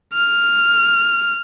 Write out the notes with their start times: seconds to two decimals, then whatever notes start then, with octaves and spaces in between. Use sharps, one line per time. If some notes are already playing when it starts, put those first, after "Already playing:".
0.13 F6